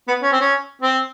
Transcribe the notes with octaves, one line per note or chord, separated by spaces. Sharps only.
B3
C#4
C4
C#4
C4